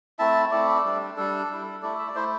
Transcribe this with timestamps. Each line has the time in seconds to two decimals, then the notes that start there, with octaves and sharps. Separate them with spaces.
0.19 A3 C4 E4 E5 A5
0.51 A3 C4 E4 A4 D5
0.84 G3 D4
1.16 G3 D4 A4
1.50 G3 E4
1.82 A3 E4 A4 D5
1.99 E5
2.08 D5
2.15 A3 E4 C5